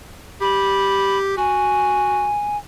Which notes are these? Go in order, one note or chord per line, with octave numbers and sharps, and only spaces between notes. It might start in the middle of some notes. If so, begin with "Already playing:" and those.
G4 B5
F#4 G#5